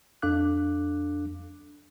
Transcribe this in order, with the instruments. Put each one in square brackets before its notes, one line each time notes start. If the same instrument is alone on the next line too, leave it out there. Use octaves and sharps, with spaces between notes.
[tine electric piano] F2 D4 A4 F5 D6 F#6